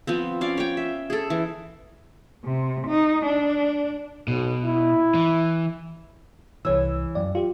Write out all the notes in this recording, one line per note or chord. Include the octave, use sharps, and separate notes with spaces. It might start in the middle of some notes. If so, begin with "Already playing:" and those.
F3 B3 C4
C#4 D5 F5
C#5 G5
E5
G#4 A4
E3
C3
D#4
D4
B1 B2
E4
E3
C2 E3 C#5 E6
F#2 D5
F4 G4